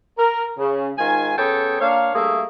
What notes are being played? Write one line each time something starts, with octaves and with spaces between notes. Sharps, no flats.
A#4
C#3
G#2 D#3 F4 G#5
C#3 B3 A4 C#5 G5
A#3 D4 C#5 F5
G2 A3 A#3 G#4 E5